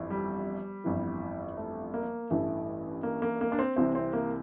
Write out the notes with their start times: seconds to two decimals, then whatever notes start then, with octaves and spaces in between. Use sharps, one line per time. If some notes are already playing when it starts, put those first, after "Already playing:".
Already playing: G1 F2 E3
0.10 G3
0.84 G1 F2 E3
1.57 A3
1.94 A#3
2.30 A1 G2 E3 A3
3.03 A#3
3.22 A#3
3.41 A#3
3.52 D4
3.59 C4
3.77 C2 C3 E3 C4
3.95 C4
4.13 A#3